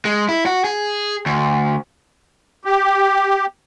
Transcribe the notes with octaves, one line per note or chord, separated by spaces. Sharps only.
G#3
E4
F#4
G#4
D2
G4